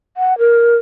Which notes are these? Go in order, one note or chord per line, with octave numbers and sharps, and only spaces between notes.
F#5
A#4